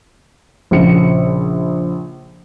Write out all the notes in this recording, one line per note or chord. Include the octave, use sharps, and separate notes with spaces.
A#1 C#3 C#7